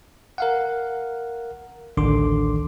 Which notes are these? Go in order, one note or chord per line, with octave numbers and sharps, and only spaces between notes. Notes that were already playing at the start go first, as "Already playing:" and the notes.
A#4 F5 F#5
A1 D2 D3 D#3 C6 D6